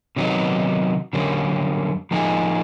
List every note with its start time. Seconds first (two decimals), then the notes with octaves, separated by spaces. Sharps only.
0.16 C3 D#3 F#3 B3 D#4
1.13 F#2 D3 G3 A#3 C#4
2.11 F3 A#3 D#4 G#4